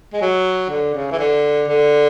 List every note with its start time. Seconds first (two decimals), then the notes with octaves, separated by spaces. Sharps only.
0.13 G#3
0.22 F#3
0.70 D3
0.95 C#3
1.11 E3
1.19 D3
1.68 D3